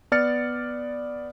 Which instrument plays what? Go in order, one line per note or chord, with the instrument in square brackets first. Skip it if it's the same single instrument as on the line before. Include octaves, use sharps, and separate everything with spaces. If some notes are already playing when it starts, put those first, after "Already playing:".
[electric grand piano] B3 D5 F6 A6 C#7